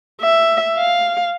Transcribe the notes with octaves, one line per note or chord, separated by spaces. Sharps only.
E5
F5